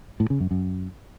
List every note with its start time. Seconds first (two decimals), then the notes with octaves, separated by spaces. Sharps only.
0.20 A2
0.30 C#3
0.40 F#2
0.51 F#2